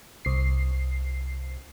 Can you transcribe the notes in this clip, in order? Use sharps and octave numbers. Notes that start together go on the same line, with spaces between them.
C2 C7